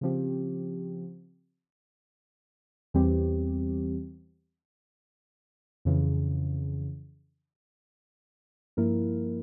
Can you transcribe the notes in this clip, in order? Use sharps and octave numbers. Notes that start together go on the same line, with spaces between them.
C#3 F3 C4 G4
E2 E3 G3 C4 G4
F2 C#3 E3
G2 F3 A#3 E4 A#4